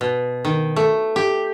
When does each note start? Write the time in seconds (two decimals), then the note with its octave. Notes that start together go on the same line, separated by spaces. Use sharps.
0.01 B2
0.45 D#3
0.76 A3
1.16 G4